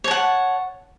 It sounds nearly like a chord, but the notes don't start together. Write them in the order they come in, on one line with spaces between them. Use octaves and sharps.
C#5 A5 F#5